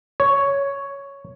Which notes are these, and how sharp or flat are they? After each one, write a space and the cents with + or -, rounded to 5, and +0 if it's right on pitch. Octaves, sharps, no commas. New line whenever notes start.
C#5 +5